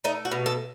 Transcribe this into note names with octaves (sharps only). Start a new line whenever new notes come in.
A3 D#4
F#4
B2
A4